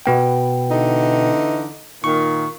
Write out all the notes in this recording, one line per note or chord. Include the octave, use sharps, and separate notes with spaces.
B2 B3 G5
D3 E3 D#4
A#2 D#3 C#6